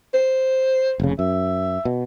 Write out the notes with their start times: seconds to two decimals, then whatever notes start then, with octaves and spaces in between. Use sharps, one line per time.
0.14 C5
1.00 F1 C#3
1.19 F#2 E5
1.85 B2